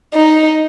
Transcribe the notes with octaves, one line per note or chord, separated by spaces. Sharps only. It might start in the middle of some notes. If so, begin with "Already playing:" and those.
D#4